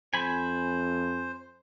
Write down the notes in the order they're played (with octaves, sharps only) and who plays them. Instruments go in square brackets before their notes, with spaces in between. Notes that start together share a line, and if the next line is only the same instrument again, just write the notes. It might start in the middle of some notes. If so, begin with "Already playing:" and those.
[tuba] F2 [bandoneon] C5 [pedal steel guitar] G#5 B5